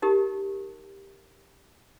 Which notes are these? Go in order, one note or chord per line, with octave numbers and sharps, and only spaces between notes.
D#4 G4 A#4